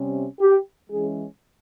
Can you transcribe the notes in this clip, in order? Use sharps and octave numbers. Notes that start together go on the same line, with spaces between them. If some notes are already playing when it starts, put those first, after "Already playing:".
Already playing: C3 G3 C#4
G4
E3 G#3 C#4 G#4